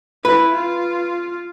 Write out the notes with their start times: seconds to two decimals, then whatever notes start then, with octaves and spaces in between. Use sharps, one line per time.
0.25 E4 B4
0.54 F4